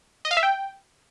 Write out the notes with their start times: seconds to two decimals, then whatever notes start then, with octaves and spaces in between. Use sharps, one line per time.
0.25 D#5
0.31 F5
0.37 E5
0.43 G5